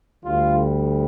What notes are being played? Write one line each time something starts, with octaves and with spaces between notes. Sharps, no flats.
D2 D3 G3 F4